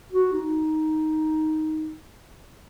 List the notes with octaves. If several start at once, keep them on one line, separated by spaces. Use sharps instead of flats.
F#4
D#4